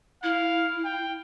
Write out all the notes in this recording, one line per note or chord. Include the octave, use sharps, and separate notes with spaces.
E4 F5
G5